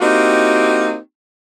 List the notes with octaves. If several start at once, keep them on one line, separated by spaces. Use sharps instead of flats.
A#3 C4 D#4 E4 F#4 G4